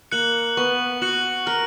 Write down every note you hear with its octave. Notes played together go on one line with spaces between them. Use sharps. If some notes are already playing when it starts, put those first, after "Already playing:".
A#3 F#6 C#7 F#7
B3 C#6
F#4 F#6 C#7 F#7
A#4 F6